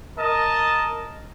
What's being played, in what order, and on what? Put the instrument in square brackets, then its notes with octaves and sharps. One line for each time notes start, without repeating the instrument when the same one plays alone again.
[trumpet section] A#4 D#5 A5